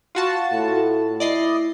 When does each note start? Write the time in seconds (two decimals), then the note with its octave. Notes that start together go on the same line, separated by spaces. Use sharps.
0.15 F4 F#4 A5
0.52 A2
1.20 E4 D5 D#5 C7